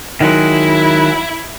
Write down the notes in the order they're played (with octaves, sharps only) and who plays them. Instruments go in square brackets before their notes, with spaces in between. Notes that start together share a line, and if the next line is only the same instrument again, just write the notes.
[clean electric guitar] D#3 F#3 G#3 [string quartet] E4